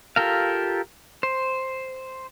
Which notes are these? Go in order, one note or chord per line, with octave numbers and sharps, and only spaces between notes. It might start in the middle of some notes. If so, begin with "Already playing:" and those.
F4 G4 A4 A#4 F5
C5